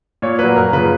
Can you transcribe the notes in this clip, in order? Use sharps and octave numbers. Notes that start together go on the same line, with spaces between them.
A#2 C#5
F#3 A#3 B4
F#2 A#4
C#3 F3 B4